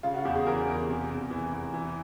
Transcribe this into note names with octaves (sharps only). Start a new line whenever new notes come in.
C#3 F4
F#4
E2 G4
G#4
E3 A#4
E2
C3
E2
E3
E2
E3